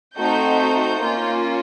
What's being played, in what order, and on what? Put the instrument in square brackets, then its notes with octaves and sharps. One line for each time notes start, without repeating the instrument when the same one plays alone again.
[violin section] A3 C4 D#4 F#4 G6
A#3 C#4 F4